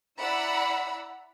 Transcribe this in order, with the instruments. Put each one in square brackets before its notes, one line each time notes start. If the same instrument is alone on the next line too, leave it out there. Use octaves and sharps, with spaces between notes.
[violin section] E4 D5 F#5 A#5 B5 E6